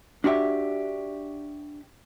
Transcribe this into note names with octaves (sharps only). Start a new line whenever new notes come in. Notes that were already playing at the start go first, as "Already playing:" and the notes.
D4 F#4 G4 E5